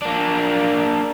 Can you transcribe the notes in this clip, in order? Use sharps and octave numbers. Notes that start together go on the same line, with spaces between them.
A#3 D4